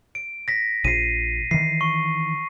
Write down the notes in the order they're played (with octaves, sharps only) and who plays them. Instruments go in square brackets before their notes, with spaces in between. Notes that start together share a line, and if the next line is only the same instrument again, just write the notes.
[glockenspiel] D7
A#6 B6
[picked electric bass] A#1 [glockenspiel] C7 D#7
[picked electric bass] D#3 E3 [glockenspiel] C7
[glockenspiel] C#6